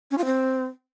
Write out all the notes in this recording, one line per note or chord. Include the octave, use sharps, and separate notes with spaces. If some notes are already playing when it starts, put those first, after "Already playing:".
C#4
F4
C4